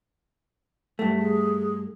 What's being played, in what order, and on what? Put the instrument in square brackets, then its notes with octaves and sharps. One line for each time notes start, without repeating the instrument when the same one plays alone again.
[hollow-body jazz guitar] G2 A3
[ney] G#4